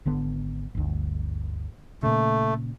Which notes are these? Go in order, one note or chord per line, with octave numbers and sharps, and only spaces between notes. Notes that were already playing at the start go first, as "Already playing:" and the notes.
G#1 D3 B3
G1 D2
A#2 C#3 A3